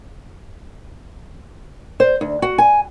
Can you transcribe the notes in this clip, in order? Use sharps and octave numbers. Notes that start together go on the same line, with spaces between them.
C5
D2
F#4
G#5